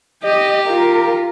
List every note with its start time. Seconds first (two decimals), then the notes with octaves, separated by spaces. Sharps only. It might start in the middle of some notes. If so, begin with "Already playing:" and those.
0.23 G4 D#5
0.67 F4 A#4